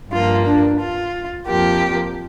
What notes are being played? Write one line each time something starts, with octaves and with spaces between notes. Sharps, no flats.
G2 F3 A#3 F4
D4
F4
F2 F3 A#3 G4